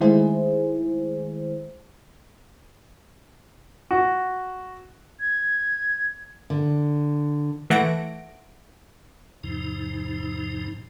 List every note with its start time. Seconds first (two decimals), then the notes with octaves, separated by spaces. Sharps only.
0.01 D#3 G#3 A3 E4 G#4 C5
3.91 F#4
5.19 G#6
6.50 D3
7.70 E3 A3 F#5 A#6 D7
9.44 E2 G#2 C3 F3 D#4